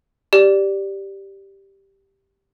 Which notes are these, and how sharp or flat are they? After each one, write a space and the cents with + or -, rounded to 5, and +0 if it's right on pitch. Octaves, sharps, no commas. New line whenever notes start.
G4 +0 D5 +0